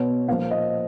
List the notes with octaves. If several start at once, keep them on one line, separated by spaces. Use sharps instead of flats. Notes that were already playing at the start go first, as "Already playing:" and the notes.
Already playing: B2 C#5
A#2 F3 F5
D#5